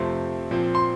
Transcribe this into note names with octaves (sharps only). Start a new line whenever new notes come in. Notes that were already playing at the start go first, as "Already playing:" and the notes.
Already playing: F2 C3 F3 A3 C4 C6
A#2 F3 C4
C6